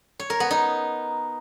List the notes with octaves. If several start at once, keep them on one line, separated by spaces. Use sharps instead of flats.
C#5
A#4
B3
D#4